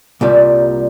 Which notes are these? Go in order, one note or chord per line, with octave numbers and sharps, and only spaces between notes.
C2 A#2 G3